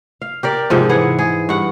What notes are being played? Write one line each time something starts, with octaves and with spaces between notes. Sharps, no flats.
F5
G4 A#4 D5
G#2 C3 F3 G#3
E3 G#4 B4 F#5
G#4
G2 F#5